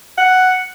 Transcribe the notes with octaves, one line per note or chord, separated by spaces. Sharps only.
F#5